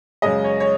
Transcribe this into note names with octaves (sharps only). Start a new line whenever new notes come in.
F#2 C#3 G#3 D#5
C#5
C#5